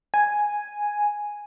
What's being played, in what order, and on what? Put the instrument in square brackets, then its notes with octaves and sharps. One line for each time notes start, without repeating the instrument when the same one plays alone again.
[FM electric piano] G#5